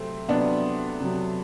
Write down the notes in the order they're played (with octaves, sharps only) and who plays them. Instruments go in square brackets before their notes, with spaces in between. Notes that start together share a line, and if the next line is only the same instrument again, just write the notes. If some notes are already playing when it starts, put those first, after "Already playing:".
Already playing: [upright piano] C3 F#3 A3 C4
C3 F#3 B3 D4
C3 F#3